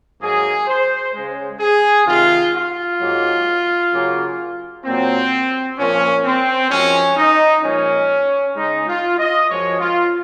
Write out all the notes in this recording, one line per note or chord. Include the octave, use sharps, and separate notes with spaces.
G#2 F#3 A#3 G#4
C5
C#3 G#3
G#4
C3 D#3 G#3 F4
F4
G#2 F#3 A#3
C#3 F#3 A#3
A#2 F#3 A#3 C4
A#2 F3 A#3 C#4
C4
F#2 F3 G#3 C#4
D#4
A#2 F3 G#3 C#4
C#3 G#3 D#4
F4
D#5
F#2 F3 G#3 C#5
F4